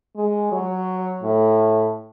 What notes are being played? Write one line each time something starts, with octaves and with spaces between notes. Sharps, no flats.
G#3
F#3
A2